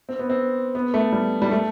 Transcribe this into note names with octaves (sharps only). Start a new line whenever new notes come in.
C4
B3
C4
B3
A3
G3
G3
A3